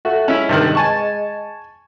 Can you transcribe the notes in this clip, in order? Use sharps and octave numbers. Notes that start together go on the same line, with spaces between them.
A3 F#4
G#3 C#4 E4
G2 C3 D#3
G#5 A5 C#6